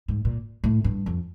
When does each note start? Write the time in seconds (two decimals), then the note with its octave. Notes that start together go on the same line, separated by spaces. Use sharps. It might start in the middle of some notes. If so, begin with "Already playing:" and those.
0.08 G#2
0.25 A#2
0.64 A2
0.84 G2
1.06 F2